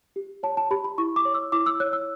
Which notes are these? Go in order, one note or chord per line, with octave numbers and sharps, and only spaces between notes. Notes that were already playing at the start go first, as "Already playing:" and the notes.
G4
C#5 A5
A5
G4 B5
B5
E4 C#6
D6
C#5
E6
E4 D6
E6
C#5 F#6
E6